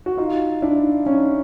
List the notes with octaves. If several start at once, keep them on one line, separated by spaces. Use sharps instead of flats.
F#4
D#4 F4
D4 E4
C#4 D#4